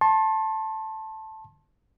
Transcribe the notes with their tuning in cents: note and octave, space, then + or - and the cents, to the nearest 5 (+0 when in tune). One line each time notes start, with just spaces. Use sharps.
A5 +0 C6 +40